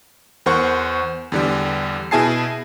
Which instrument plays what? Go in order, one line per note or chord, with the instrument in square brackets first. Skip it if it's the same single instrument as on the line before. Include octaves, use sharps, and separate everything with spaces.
[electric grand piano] E2 A#4 C5 F#5 C#6
E2 D3 G3
B2 E4 G#4 G#5 A5 C7